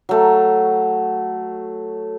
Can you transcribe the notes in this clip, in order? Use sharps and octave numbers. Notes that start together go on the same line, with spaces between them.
F#3 A3